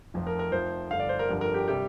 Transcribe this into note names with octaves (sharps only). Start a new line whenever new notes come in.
F1 F2 F3
A#4
A#4
F1 F2 F3 C5
G1 G2 D3 F5
D5
C5
A#4
G1 F2 D3 G3
A#4
G4
C3 G3 G4